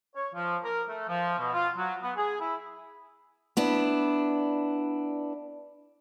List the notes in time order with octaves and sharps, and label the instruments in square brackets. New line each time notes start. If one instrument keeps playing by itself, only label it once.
[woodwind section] C#5
F3
A#4
A3
F3
B2
F4
F#3
B3
G#4
E4
[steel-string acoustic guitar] B3 D4 E4